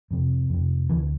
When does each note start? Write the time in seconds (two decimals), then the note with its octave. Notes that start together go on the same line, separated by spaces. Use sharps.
0.11 F2 C3
0.50 F2 C3
0.89 D2 D3 E3